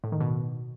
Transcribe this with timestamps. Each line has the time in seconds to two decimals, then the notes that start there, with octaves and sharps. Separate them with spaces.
0.04 A2
0.12 D#3
0.21 B2